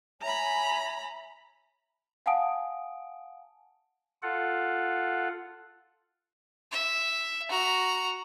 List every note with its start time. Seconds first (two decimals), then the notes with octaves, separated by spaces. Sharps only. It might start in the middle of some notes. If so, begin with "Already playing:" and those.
0.22 C#5 E5 G#5 A#5 B5
2.26 F5 F#5 G#5 A5 D#6 D7
4.22 F4 A4 F#5
6.72 E5
7.49 F#4 A#5